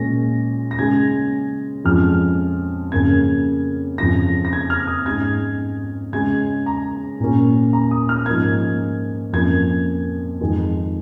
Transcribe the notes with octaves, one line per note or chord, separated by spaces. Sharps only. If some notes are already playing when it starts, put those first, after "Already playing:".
Already playing: A#2 G#3 C#4 A#6
A#6
C#3 G#3 C#4 G#6
F2 F3 G#3 C#4 F6
F2 C#3 A#3 C#4 G#6
F2 C#3 F3 C#4 A#6
A#6
G#6
F6
D#6
G#2 G#3 C#4 G#6
C#3 G#3 C#4 G#6
A#5
A#2 A#3 C#4
A#5
D#6
F6
G#2 F3 A#3 C#4 G#6
F2 F3 A#3 C#4 G#6
F2 D#3 G#3